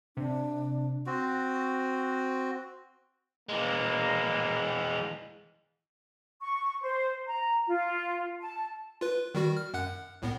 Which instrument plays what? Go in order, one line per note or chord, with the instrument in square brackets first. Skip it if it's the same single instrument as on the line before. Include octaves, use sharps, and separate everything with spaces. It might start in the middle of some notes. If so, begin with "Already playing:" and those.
[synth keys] C3 [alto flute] D4
[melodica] C4 F#4
[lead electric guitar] E3 G#3 [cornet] A#3
[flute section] C#6
C5
A#5
F4
A5
[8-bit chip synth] F4 B4
D#3 G3 F#4
F6
F#2 F#5 F#6
C2 A2 B3